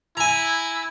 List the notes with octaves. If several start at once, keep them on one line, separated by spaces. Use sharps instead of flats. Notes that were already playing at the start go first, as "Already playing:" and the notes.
E4 G#5 A#5